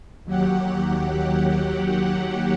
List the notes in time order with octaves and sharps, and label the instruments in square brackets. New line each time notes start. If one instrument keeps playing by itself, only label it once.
[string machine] D#2 F#3 G4 F#5